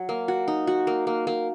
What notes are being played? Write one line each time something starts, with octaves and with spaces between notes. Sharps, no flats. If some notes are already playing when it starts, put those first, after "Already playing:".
Already playing: F#3
A#3
F#4
D#4
F#4
A#3
A#3
A#3